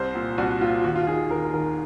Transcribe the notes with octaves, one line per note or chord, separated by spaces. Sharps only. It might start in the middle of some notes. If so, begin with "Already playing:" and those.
Already playing: C2 C5
A#2
C2 F#4
A#2 F4
D#2 F#4
F4
D#3 G#4
D#2 A#4
D#3 A#4